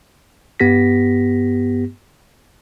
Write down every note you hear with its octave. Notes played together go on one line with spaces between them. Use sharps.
G2 B3 G4 A#6 B6